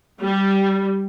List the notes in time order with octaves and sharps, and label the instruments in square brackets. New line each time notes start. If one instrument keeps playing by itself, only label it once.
[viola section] G3